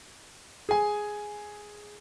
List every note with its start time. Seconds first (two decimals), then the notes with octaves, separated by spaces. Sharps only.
0.69 G#4 G#5